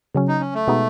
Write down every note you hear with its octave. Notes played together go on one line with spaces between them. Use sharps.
C#3 F#3 C#4
D#4
C#4
A3
B2 G#3 B3 D#4